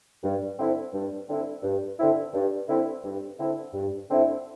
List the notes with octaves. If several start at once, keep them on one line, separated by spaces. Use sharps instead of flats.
G2
D3 C4 E4
G2
D3 C4 E4
G2
D3 C4 E4
G2
D3 C4 E4
G2
D3 C4 E4
G2
D3 C4 E4